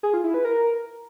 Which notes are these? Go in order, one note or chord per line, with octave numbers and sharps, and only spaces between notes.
G#4
F4
E4
B4
A#4